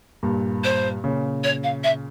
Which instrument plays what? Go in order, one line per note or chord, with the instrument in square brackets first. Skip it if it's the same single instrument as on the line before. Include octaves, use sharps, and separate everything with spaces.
[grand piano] G2 A#2
[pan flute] C5
[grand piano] A#2 C#3
[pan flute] C#5
F5
E5